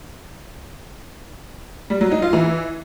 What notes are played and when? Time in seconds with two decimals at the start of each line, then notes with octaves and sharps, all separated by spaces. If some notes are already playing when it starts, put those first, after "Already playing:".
1.90 G3
2.01 F#3
2.11 D#4
2.22 F4
2.33 E3